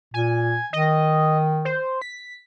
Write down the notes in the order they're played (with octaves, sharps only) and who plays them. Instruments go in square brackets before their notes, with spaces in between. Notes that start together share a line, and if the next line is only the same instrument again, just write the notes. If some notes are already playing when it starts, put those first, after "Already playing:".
[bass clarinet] A#2 [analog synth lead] G#5
[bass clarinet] D#3 [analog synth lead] D#5
[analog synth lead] C5
B6